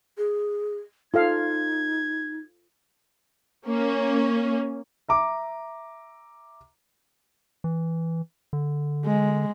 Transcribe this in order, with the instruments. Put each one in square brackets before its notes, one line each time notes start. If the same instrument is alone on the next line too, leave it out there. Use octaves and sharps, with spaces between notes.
[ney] G#4
[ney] D#4 [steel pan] F4 A4 F5 [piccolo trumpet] G#6
[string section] A#3 C#4
[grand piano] E5 A#5 D6
[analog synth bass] E3
D3
[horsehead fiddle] G#3